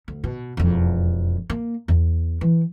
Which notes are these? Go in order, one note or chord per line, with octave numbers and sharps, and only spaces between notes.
D2
B2
E1 F2
A#3
E2
E3